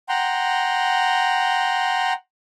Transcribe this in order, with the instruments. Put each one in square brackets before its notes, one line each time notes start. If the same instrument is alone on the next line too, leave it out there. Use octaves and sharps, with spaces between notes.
[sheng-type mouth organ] F#5 G5 A#5 C6